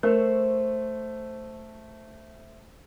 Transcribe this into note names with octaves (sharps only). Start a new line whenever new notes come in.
A3 A#4 C5 C#5 E6